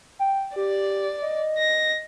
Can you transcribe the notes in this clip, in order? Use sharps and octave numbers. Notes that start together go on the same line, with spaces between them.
G5
G4 D5
D#5
A#6